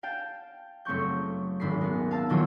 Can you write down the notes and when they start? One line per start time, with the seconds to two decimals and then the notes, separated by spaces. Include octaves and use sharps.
0.03 F5 G5 A5
0.85 F#1 A3 C4 C#6 G6
1.60 D#1 G#1 B5 C7
1.81 G#3 B3
2.11 F5 A5 E6
2.29 A#2 D#3 E3 F#3 E4 F4